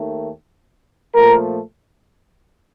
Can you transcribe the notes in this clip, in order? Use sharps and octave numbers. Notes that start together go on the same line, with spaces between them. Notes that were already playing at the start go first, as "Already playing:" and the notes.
Already playing: D#2 D#3 A3
A#2 F3 A3 A#4